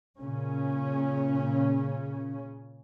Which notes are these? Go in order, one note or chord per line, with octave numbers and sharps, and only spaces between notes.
A#2 C#3 C#4